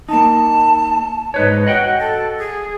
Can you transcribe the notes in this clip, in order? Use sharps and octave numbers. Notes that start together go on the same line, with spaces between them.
A#3 D#4 A5
G#2 D#4 B4 C#5
F#4 D#5 F#5 G5
A4
G#4